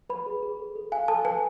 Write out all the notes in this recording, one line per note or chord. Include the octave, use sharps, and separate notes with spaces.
B4 B5
G#4
G#4
A4
A4
F5 G#5
A4 A5
B4 G#5